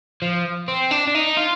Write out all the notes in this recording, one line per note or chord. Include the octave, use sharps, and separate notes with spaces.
F3
C4
D4
D4
D#4
F4